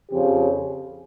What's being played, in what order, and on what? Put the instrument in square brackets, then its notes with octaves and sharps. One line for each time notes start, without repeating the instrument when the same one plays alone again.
[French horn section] F2 C#3 F3 C4 G4